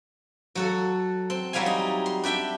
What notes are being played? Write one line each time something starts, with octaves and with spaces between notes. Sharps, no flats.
F#3 F#4 A4
C4
F#3 G3 E4 F5 G#5
D#4
C6
D4 G4 E5 G5